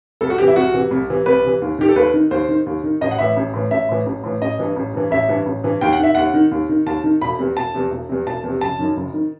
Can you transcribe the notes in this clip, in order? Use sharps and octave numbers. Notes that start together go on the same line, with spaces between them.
C2 A4
F#4
C3 E3 G4
E4
C2 F#4
C3 E3
C2
C3 E3
C2 B4
C3 E3
D#2
D#3 G4
A4
D#2 B4
D#3
D#2 C5
D#3
D#2
D#3
A1 D#5
F#5
A2 E3 E5
A1
A2 E3
A1 E5
A2 E3
A1
A2 E3
A1 D#5
G2 E3
A1
G2 E3
A1 E5
G2 E3
A1
G2 E3
D#2 G5
F#5
D#3 E5
D#2 F#5
D#3
D#2
D#3
D#2 A5
D#3
E1 B5
E2 C3
E1 A5
E2 C3
E1
E2 C3
E1 A5
E2 C3
F#1 A5
F#2 D#3
F#1
D#3